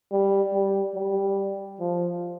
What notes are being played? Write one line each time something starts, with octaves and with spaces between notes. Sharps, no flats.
G3
G3
G3
F3